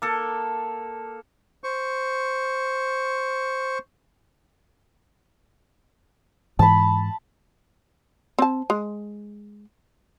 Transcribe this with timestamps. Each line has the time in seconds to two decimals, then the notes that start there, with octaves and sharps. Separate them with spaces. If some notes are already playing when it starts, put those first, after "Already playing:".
0.02 A#3 A4
1.64 C5 C#6
6.59 G#2 E3 A5 B5
8.39 C4 A5
8.70 G#3